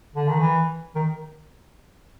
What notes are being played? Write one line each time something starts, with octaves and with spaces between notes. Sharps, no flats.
D3
D#3
E3
D#3